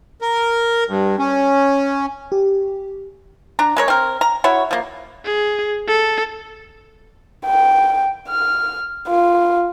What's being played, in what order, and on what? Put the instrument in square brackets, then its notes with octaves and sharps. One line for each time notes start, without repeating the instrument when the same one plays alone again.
[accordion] A#4
G2
C#4
[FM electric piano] G4
[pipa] D4 A#5
G#3 A#4 C#5
C4 A#4
A#5
E4 F#4 C#5
F3 A#3
[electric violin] G#4
A4
[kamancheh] G5
F6
F4